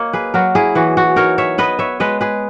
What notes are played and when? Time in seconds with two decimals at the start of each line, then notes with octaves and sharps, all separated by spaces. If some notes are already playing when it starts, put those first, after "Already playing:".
Already playing: A#3 C#5 D#5
0.13 G#4 B4
0.34 F#3 F#4 A#4
0.55 E4 G#4
0.75 E3 F#4
0.97 F#4
1.16 D#4 A#4 C#5
1.38 C#5 E5
1.58 B3 B4 D#5
1.79 C#5 E5
2.00 G#3 B4 D#5
2.21 G#4 B4